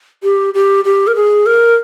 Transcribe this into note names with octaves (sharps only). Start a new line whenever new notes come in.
G4
G4
G4
A#4
G#4
A#4